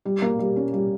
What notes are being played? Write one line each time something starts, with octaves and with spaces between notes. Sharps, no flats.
G3
A#3
G3
C#4
G3